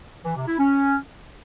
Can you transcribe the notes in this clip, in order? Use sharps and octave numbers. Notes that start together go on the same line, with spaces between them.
E3
C3
E4
C#4